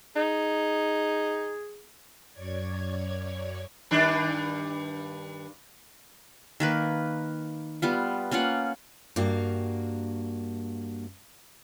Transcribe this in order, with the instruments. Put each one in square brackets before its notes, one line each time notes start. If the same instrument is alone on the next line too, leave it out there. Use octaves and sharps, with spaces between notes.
[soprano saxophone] D#4 [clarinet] G#4
[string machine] F#2 C#5 D5 G#6
[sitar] G2 D#3 D4
[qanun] D#3 A#3 B4
G3 B3 F4
A#3 C#4 F4 F#5
[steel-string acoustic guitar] G2 A#3 F#4 F5